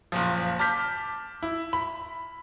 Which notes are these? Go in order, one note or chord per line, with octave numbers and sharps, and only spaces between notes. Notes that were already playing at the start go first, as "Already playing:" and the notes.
F#1 A#2 F3
A5 D6 F6 G6 B6
E4
B5